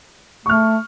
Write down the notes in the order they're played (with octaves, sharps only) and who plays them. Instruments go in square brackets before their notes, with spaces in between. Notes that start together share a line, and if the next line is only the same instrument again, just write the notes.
[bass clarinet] A3 [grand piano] C#6 F6